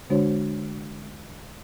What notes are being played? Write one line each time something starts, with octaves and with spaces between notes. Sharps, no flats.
D3 G#3 D4 F#4 C5 C#5